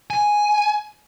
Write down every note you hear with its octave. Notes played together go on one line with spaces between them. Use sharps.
G#5